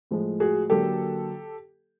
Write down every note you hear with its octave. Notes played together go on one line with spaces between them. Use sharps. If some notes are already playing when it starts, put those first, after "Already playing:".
A2 F3 G#3
F#4 G#4
D3 F#3 A#3 G4 A4